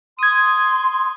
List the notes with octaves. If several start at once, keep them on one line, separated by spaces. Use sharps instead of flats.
C6 D#6 G#6